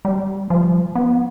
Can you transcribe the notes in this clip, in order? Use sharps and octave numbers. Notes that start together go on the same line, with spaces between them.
G3
F3
B3